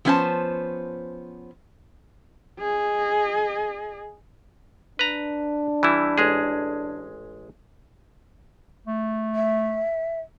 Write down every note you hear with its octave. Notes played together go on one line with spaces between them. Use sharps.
F3 B3 C#4 E4 C5 A5
G#4 D#5
D4 B4 A#5
E3 G3 E4
A1 G#3 G#4
A3
E5